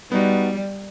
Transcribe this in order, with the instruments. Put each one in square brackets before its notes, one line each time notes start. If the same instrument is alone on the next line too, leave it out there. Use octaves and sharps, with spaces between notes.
[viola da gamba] G3 [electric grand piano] B3 D#4 F#4